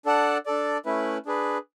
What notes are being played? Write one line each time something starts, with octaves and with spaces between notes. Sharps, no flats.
D4 A4 D5 F#5 A5
D4 A4 D5
A3 C#4 E4 B4
D4 G#4 B4